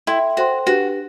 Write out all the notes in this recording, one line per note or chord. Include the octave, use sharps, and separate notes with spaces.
E4 A4 E5 G5 C6
F#4 A4 C5 G5 C6
D4 F#4 G4 B4